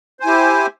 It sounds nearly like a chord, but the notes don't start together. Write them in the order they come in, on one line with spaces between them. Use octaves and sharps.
C5 G#5 E4 G4